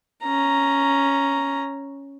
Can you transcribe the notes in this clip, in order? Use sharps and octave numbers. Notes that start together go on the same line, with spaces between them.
C#4 A#5